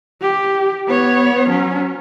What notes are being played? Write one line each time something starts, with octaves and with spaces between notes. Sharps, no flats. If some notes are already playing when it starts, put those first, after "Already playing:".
G4
B3 C#5
F#3 C#4